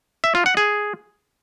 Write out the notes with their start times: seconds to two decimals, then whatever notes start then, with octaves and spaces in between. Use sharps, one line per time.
0.24 E5
0.35 F4
0.46 F#5
0.57 G#4